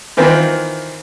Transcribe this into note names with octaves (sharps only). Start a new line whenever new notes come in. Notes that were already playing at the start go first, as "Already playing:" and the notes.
D#3 E3 C4 F4